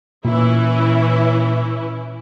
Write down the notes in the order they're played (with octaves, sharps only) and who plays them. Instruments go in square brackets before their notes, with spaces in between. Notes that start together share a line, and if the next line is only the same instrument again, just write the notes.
[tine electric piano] A#2 [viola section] E3 C#4 E4